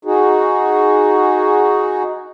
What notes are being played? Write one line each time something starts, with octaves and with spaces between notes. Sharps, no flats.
D#4 F#4 G#4